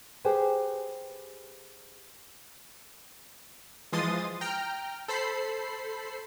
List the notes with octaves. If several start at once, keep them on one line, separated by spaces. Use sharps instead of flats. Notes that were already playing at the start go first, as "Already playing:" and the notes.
G4 G#4 B4 C5 G5 G#5
E3 F3 G#3 C6 D#6 A6
G5 A#5 F6
A4 C5 B5 C7